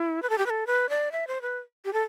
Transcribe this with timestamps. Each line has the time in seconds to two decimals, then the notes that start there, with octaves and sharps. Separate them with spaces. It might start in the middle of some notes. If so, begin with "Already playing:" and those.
Already playing: E4
0.22 B4
0.30 A4
0.38 G4
0.46 B4
0.50 A4
0.67 B4
0.89 D5
1.12 E5
1.27 C5
1.42 B4
1.85 G4
1.93 A4